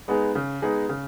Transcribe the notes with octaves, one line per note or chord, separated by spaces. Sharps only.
G#3 B3 D#4 G#4
C#3
G#3 B3 D#4 G#4
C#3